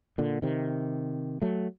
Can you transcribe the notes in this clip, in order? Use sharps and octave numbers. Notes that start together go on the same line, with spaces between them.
A#2 D3
C3 D#3
F#3 A3